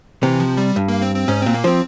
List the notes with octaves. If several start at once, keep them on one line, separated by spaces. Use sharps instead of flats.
C3 E3
F3
G3
G2
A#3
C4
C4
G#2 C#4
A#2 C4
A#3
F3 C4